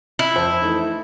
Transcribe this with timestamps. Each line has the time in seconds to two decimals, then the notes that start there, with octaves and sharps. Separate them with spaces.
0.19 E4
0.36 F2 F3 C5
0.62 E3 A3 D#4